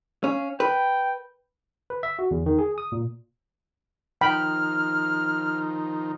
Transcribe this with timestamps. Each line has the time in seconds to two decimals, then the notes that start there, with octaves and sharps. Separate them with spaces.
0.24 C#4 F5
0.60 B4 G5
1.90 B4
2.03 E5
2.19 F#4
2.31 E2
2.46 D#3
2.58 G#4
2.78 D#6
2.92 A#2
4.21 D#3 F3 D#4 G5 B5 F6